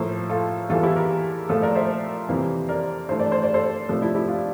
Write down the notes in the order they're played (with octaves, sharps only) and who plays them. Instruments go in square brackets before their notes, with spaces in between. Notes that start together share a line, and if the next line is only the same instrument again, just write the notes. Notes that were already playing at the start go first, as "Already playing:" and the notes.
Already playing: [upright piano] A2 F3 A#3 A4 C5
F4 A4
E2 E3 G3 F4 A4
E4 G4
G4 A#4
A#2 F3 A3 F4 A4
A#4 D5
C5 E5
F2 C3 E3 A#3
A#4 D5
G2 E3 A3 C5
D5
C5
D5
A4 C5
C3 F3 A3 D4
E4
E4 G4
D4 F4